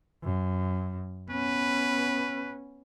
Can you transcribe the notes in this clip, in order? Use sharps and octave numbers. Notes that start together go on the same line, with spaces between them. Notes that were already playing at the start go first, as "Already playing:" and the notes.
F#2
B3 C#4 B4